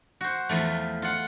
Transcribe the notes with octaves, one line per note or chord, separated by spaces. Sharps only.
F#4 C5
E2 F3 A3
F4 F#5